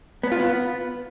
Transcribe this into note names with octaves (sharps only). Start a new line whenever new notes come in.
B3
F4
B3